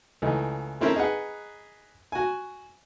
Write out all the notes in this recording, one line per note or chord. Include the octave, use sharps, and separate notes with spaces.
C#2 E3 A3 D#4
A3 C4 C#4 E4 A#4
D#4 G#4 B4 F#5
F#4 G#5